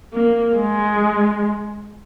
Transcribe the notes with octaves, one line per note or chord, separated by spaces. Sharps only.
A#3
G#3